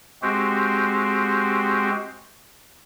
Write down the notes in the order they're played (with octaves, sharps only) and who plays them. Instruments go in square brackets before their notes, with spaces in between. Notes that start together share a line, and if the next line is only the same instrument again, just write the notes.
[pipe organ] G#3 C4 F#4 G4